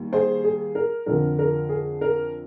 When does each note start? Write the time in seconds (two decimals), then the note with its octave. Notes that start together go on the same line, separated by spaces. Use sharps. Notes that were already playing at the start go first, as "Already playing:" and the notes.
Already playing: D#2 G3
0.13 G#4 C5
0.44 G#4
0.75 A#4
1.06 F2 D3 F3 A#4
1.39 A#4
1.69 G#4
2.01 A#4